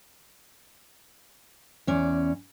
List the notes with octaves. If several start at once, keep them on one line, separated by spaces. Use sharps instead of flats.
E2 C#4 D5